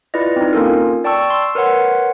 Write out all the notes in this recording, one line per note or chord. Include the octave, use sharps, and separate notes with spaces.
E4 F4 B4 D5 D#5
C4 D#4
A#3 C#4 F4 A4 A#4
D5 G5 A5 C#6 E6
C6 E6
A#4 B4 C#5 F#5 C6